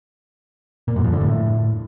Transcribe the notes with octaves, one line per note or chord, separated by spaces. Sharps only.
A#2
F#2
F2
D3
A2